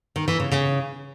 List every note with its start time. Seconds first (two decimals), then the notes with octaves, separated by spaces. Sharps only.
0.16 D#3
0.28 E3
0.40 C#3
0.51 C#3